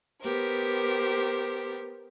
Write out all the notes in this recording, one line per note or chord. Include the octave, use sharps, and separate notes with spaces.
B3 G4 A#4 C5